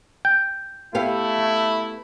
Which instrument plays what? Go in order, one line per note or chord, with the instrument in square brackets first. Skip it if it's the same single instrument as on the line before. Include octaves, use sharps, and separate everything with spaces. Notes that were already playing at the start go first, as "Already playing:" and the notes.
[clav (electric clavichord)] G5
[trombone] A3 [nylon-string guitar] B3 G4 F5 [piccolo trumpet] E4